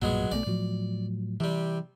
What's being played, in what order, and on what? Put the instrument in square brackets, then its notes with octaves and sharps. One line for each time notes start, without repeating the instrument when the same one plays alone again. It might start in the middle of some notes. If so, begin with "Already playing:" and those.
[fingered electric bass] B1 G2 A#2 [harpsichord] F#3 G#3 B3
[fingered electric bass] B1 B2 A3 [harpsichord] D5
[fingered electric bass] A2 F3 F#3
[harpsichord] C3 G3 [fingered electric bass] E3